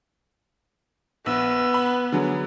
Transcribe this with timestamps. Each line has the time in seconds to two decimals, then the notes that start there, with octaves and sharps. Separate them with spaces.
1.26 A#1 B3 E6
1.74 B5
2.12 D3 F#3 G#4